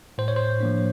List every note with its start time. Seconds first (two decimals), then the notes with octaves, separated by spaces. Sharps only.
0.18 A2 C5
0.28 C#5
0.36 C5
0.60 F3 A#3 D4